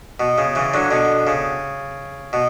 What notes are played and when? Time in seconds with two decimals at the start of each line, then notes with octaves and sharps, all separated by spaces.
0.20 B2
0.38 C#3
0.55 C#3 E3
0.74 D3 F#3
0.91 B2 D3
1.27 C#3
2.33 B2